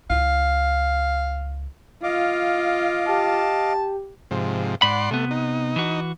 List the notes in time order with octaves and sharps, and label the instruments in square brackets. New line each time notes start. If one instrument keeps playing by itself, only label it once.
[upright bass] C#2 E4 [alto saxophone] F5
[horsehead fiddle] F4 [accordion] D#5 F5 D6
[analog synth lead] G4 [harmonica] A5
[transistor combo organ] G#2 C3 F3
[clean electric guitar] G#2 B5 [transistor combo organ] D5 F#5 C6
[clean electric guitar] C3 B3 [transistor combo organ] A3
[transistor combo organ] D#4
[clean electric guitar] E3 F#4